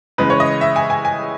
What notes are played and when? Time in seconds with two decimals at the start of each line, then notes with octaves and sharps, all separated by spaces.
0.18 C#3 E3 G#3 B4
0.30 C#5
0.40 D#5
0.61 E5
0.76 G#5
0.90 G#5
1.05 G#5